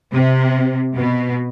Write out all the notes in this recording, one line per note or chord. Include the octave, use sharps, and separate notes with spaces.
C3
B2